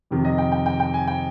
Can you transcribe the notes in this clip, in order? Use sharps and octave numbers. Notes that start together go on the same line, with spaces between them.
F2 C3 D#3
D#5
G5
G5
G5
G5
G#5
G5